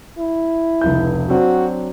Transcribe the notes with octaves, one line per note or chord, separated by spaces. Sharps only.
E4
F1 C#2 G6
F#3 C4 D4 F#4